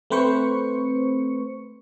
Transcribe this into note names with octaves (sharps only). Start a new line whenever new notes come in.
A3 C4 B4 C5 C#6 C#7